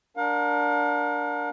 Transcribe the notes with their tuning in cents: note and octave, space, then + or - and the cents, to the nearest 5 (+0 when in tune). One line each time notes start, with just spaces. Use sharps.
D4 -5 A#4 +0 F5 +45